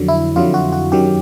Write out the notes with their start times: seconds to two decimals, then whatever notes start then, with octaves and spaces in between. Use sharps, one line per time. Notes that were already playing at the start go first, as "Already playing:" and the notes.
Already playing: F2 D3 F#3
0.08 E4
0.36 F2 D3 F#3 F4
0.54 F#4
0.73 F#4
0.92 F#2 D#3 F#3 G4